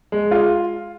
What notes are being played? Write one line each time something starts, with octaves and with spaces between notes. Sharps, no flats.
G#3
F4